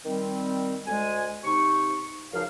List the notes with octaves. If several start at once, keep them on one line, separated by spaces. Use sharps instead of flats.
D#3 G3 C4
D2 G#3 G#5
C3 D#4 C#6
C#2 F#2 F3 D#4 F5